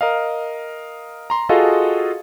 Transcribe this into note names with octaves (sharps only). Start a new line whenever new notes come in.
A#4 D#5 F5
A#5 C6
F4 F#4 G#4 A4 D#5 F5